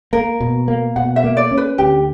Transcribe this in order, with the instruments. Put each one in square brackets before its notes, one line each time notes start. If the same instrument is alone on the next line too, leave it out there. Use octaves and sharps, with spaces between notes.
[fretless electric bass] A#3 [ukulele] A#4
[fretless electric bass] B2
A#3
[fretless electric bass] B2 [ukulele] F#5
[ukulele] E5
[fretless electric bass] A#3
[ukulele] D5
[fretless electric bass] C#4
[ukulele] B4
[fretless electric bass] D2 [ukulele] G4